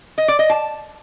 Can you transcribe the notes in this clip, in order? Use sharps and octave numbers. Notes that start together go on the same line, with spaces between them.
D#5
D5
D#5
A5